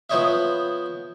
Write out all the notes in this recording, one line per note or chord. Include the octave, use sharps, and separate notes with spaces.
F3 B3 C5 C#5 D#5 E5